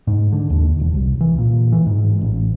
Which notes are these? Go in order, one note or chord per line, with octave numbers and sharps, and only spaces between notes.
G#2
D3
D#2
E1
C2
E3
A#2
E3
G#2
A1